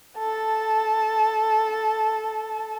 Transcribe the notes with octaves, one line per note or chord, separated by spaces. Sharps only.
A4 A5